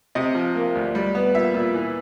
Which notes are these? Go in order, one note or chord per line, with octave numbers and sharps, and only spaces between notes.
C3 D#5
F3
A#3
D2
G3
B3
A#2 E5
A#2
E3